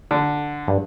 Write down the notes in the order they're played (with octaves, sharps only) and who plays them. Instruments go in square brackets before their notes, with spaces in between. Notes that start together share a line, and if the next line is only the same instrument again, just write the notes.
[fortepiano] D3
[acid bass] G2